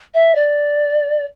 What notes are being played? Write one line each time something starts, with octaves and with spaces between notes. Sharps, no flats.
E5
D5